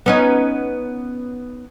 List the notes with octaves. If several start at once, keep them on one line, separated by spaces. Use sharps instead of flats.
B3 C#4 D#4